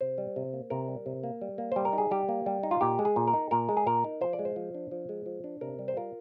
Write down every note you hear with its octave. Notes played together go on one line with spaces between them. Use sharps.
C3 C5
G3
C3
A#3
C3 A#4
G3
C3
A#3
G3
A#3
G3 C5
A#4
D#4
G#4
G3 G4
A#3
G3
D#4
F4
A#2 G4
G#3
G#4
A#2
A#4
D#4
A#2 A#4
G#3
G#4
A#2 A#4
D#4
F3 C5
D5
G#3
C5
F3
D4
F3
G#3
F3
D4
C3 A#4
G3
C5
F4 A#4